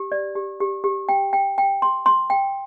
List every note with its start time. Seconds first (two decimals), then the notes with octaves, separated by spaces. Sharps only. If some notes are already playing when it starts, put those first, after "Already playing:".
Already playing: G4
0.12 D5
0.35 G4
0.60 G4
0.84 G4
1.09 G5
1.33 G5
1.58 G5
1.82 C6
2.06 C6
2.30 G5